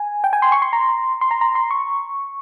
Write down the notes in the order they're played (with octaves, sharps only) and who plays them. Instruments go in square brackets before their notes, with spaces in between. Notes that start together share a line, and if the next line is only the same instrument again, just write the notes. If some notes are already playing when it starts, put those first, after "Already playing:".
Already playing: [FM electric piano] G#5
G5
G#5
C6
C#6
C6
A#5
C6
A#5
A#5
C6
C#6